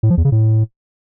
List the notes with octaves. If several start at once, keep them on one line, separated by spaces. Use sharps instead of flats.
A2
F3
E2
C#3
A2